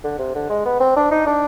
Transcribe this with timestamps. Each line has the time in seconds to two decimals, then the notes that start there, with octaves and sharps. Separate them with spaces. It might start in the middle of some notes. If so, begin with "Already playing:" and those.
0.04 D3
0.18 C3
0.35 D3
0.50 G#3
0.65 B3
0.80 C4
0.96 D4
1.11 D#4
1.26 D4